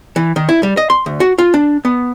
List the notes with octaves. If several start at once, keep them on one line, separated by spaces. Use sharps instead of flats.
E3
D#3
E4
G3
D#5
C6
D2
F#4
F4
D4
B3